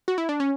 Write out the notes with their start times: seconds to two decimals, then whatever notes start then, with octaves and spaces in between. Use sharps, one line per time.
0.08 F#4
0.18 E4
0.29 D4
0.40 C#4